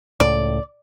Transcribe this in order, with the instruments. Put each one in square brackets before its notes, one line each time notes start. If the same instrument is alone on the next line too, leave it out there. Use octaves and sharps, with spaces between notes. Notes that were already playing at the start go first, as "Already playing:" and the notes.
[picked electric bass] C#2 A2 [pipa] D5